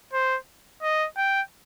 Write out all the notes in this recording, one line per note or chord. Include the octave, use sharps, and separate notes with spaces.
C5
D#5
G5